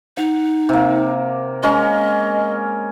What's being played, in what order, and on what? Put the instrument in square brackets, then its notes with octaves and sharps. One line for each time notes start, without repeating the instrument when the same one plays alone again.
[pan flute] D#4 [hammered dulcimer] F#5
[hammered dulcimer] C3 A#3
[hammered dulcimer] G#3 C#4 A#4 [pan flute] D#5